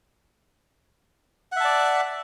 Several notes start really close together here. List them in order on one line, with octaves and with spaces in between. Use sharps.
F#5 E5 A5 D5